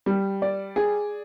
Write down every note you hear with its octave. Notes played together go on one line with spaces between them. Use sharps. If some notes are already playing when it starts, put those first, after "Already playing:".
G3
D5
G#4